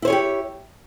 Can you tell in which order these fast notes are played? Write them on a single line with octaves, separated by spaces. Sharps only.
E4 C5 C#5 G#4 G4